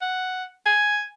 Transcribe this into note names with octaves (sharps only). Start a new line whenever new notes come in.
F#5
G#5